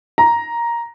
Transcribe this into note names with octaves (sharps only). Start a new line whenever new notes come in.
A#5